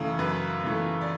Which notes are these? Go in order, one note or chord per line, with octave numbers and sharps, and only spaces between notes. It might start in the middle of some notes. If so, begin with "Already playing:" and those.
Already playing: F#2 C#3 E3 A3
F#2 B4
C#3 E3 A3
D5